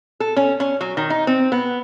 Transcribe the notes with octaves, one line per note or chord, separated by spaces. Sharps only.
A4
C#4
C#4
F#3
D#3
D#4
C4
B3